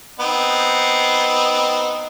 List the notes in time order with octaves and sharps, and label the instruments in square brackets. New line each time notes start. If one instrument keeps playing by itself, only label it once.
[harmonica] B3 C4 D#4